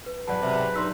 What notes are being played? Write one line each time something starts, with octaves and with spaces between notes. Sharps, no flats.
B4
B1 G#2 F#3 B4 D5 F#5 A5
C3
G2 D#4 C6 E6 B6